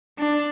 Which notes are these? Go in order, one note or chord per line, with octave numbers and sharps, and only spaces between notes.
D4